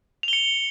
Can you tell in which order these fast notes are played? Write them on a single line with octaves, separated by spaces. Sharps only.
F7 G7 C#7